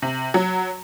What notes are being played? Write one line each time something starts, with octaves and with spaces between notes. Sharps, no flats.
C3
F#3